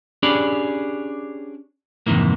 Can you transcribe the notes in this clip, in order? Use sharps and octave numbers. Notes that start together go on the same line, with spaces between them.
C#4 D4 G4 G#4 D5 B5
F2 G#2 C3 D#3 E3 A#3